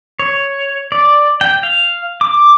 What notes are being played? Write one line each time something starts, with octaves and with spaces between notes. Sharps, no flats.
C#5
D5
G5
F5
D6